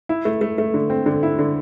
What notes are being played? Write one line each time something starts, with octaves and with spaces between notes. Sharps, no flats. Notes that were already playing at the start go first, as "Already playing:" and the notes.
E4
A3
A3
A3
D3
C4
D3
E4
D3